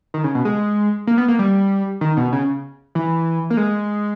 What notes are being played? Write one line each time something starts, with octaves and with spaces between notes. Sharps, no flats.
D#3
C#3
B2
G#3
A#3
B3
A#3
G3
D#3
B2
C#3
E3
A#3
G#3